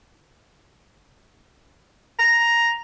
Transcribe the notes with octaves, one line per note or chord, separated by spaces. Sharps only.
A#5